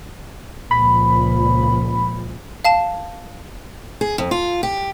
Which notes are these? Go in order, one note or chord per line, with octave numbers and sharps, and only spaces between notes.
C#2 A#2 F3 B5
F5 A5 E7
G#4
F2
F4
G4